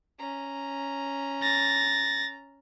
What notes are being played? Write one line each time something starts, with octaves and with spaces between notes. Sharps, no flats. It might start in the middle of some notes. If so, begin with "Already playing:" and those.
C#4 A#5
A6 A#6